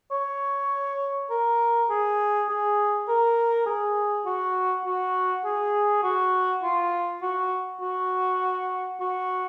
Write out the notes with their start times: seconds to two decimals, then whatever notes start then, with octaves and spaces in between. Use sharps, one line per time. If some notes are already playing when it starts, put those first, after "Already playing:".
0.11 C#5
1.30 A#4
1.90 G#4
2.49 G#4
3.08 A#4
3.66 G#4
4.26 F#4
4.86 F#4
5.45 G#4
6.03 F#4
6.63 F4
7.22 F#4
7.81 F#4
9.00 F#4